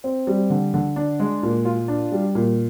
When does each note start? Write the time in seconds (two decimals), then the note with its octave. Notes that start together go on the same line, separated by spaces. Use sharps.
0.04 C4
0.27 G3
0.50 D3
0.74 D3
0.96 D4
1.20 G#3
1.43 A#2
1.65 F4
1.88 D4
2.12 G3
2.35 A#2